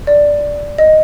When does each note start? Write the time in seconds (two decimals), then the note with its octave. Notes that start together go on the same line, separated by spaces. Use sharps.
0.07 D5
0.78 D#5